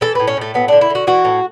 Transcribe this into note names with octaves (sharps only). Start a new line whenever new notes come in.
E3 A4
B4
A2
C#4
A2 A3
F#3 B3
D3 D4
E4
D3 F#4
E3 F#4
A2